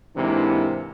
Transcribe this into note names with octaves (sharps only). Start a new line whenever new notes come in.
G#2 C3 E3 A#3 D4 E4